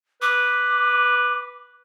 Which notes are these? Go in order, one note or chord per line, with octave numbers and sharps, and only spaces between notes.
B4 D6